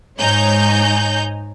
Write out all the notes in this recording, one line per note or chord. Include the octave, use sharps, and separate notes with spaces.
G#2 D#4 C#5 G#5 A#5 G6